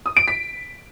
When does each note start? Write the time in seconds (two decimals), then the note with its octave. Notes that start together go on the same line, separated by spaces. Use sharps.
0.06 D#6
0.17 D7
0.28 B6